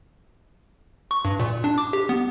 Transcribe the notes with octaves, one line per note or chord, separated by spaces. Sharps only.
C#6
G2
A#2
D4
D6
G4
B3